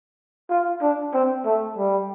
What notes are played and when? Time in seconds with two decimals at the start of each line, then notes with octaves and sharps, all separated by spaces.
0.50 F4
0.82 D4
1.14 C4
1.45 A3
1.77 G3